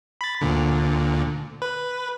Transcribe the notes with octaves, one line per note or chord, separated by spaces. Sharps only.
B5 A6
D2 A#2 D3
B4